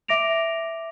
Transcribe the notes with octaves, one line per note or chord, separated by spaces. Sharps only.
E5 D6 A#6 D7 F7